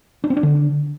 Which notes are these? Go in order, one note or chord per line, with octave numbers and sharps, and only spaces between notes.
D4
C4
D4
D3